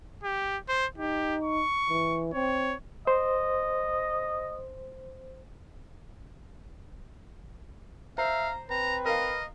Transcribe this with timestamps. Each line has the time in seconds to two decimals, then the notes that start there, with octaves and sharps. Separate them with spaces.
0.24 G4
0.69 C5
0.98 D#4 G4
1.43 C#6
1.89 E3
2.34 C4 C#5
3.07 C5 D#5
8.18 C5 E5 F5 A#5
8.70 C4 B4 A#5
9.06 A#4 D#5 F5